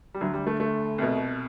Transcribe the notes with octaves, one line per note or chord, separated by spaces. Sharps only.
G3
D2 D3 F#3
G3
A3
A3
C2 B2